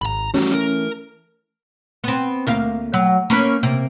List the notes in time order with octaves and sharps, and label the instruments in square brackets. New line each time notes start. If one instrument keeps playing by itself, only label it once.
[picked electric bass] G#1 [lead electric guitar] A#5 B5
[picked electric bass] E3 A3 [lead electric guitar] G3 F#4 [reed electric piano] C#4
[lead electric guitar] A#4
[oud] B3 C4
D2 A#3 F5
F#3
A#3 C#4 B4
C3 A#3